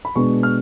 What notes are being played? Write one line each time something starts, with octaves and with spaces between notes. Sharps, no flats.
B5
B2 G#3 B3 D4 C#6
F6